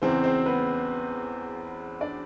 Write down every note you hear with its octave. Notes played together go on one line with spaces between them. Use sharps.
E2 C#3 E3 C4 C5
C4 C5
B3 B4
D4 D5